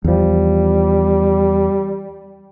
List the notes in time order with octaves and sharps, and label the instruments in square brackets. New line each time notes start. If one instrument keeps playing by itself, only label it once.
[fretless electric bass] E2 F3 [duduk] G3